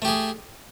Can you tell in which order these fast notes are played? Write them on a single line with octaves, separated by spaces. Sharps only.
A3 G4 G#4